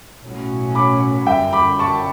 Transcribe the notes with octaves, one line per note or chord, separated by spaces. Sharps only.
B1 A2 F#3 C#4
B5 D6
G1 F#2 D3 E5 G5
B5 D6
A5 C#6